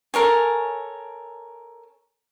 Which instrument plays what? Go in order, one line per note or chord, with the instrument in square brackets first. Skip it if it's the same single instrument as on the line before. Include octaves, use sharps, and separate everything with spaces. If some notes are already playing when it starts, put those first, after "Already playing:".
[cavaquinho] A4 A#4 C#5 G#5